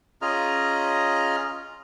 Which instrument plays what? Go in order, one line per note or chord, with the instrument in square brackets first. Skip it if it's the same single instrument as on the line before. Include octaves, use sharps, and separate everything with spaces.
[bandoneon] C#4 F4 G#4 D#5 A#5 F6